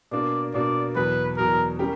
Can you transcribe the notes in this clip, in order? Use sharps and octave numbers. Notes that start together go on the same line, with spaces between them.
B2 A#3 D4 D5
B2 A#3 D4 D5
E2 B2 F#3 B4
E2 B2 F#3 A#4
G3 C#4 G4 A#4